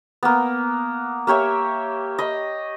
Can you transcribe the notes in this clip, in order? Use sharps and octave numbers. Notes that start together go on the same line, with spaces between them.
A#3 B3
A#3 G4 C#5 E5
D#5 B5